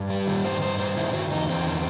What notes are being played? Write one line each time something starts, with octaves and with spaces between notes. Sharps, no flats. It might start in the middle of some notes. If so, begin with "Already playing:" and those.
Already playing: G2
G3
D#3
G2 C5
G2 C5
G2 C5
D#3 E4
D#3 F#4
E2 D#4
E2 C4
D#3